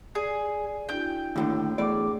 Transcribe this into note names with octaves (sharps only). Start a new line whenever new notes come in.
G#4 D5
D4 E4 F#4 G5 G6
D#2 A2 D3
E2 A2 G#4 D5 D6